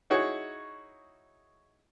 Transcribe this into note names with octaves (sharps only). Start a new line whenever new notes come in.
D#4 E4 F#4 G#4 C#5